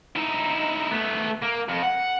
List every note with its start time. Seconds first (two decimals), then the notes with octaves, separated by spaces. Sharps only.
0.16 D#4 E4
0.91 A3 B3
1.43 A#3
1.69 F2
1.83 F#5